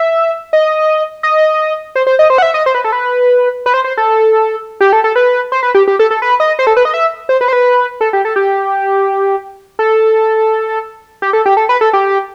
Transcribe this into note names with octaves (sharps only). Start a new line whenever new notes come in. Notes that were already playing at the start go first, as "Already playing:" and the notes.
Already playing: E5
D#5
D#5
C5
C5
D#5
C5
F#5
E5
D#5
C5
B4
A4
B4
B4
C5
C5
A4
G4
A4
A4
B4
C5
B4
G4
G4
A4
A4
B4
D#5
C5
A4
B4
D#5
E5
C5
B4
C5
B4
A4
G4
A4
G4
A4
G4
A4
G4
A4
B4
A4
G4